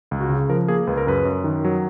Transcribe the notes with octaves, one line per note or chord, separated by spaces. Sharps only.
C#2
F#4
C#3
F3 A#4
A#3 G#4
C#2 B4
A#4
F#2 B4
F#2
D#3
F#3